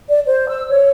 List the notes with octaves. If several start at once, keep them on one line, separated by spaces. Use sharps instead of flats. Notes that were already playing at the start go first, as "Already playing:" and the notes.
D5
C5
E6
C#5